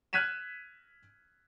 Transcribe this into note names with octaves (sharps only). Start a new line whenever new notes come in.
F6 F#6 G#6 B6 D#7 E7